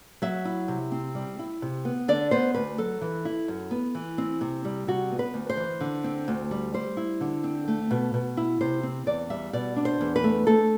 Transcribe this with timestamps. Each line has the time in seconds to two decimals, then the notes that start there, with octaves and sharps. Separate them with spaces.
0.22 F#3 E5
0.45 E4
0.68 C3
0.92 C4
1.15 G3
1.39 E4
1.62 C3
1.85 B3
2.08 D3 D5
2.31 B3 C5
2.54 D2 B4
2.78 F#3 A4
3.01 E3
3.25 E4
3.48 F#2
3.71 B3
3.95 E3
4.18 C4
4.41 C3
4.65 G3
4.87 C3 F#4
5.12 B3
5.19 B4
5.34 D2
5.49 C5
5.57 E3
5.81 D3
6.04 C4
6.28 D2
6.51 G3
6.74 G3 C5
6.97 E4
7.21 D3
7.44 C4
7.68 A3
7.91 B2
8.14 B2
8.37 E4
8.61 C3 C5
8.83 C4
9.06 E2 D5
9.30 G3 E5
9.53 B2 D5
9.76 D4
9.85 C5
10.01 E2
10.16 B4
10.24 A3
10.47 A3 A4